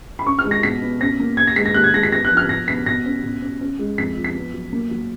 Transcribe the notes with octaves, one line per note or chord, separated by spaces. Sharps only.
B5
C#4 C#6
F6
G#3
A#6
B2 B6
B3
C#4 A#6
A#3
C#4 G#6
A#6
G#3 B6
A#6
D#2 F#6
G#6
G#3 A#6
B6
B3 A#6
F#6
F3
F6
B2 A#6
B3 B6
B2 A#6
C#4
B2
C#4
C#4
G#3
F2 B6
F3
B6
B3
F#3
A#3
F#3